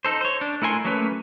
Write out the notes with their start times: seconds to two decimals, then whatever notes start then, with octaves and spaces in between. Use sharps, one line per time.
0.05 D#4 A4 C5
0.21 C5 C#5
0.41 D4
0.62 A3 E4 A#4 G#5 C6
0.85 F#3 A3 A#3 C#4 B4